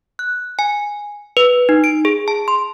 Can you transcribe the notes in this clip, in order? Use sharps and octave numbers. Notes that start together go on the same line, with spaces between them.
F#6
G#5
B4
D#4
D7
G#4
A5
C6